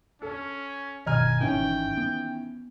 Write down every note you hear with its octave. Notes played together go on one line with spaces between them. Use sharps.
C#4 A4
G1 B2 D#3 D#5 G#5 A#5 F6
G#1 D#3 E3 C#4 G5
B3